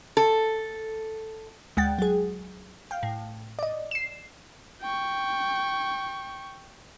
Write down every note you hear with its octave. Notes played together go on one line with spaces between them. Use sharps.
A4
D2 G#3 F#5 G5 A6
F#3 G#4
F5 G5
A2
D5 D#5
C7 E7
G5 C#6